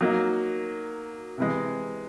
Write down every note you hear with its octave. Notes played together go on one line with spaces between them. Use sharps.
F#3 A#3 D#4
C3 E3 G#3